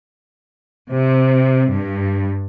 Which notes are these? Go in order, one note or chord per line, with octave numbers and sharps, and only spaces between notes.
C3
G2